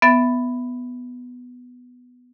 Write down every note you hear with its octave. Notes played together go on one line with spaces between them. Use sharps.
B3 E5 A6